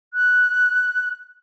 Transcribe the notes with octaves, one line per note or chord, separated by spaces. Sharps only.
F#6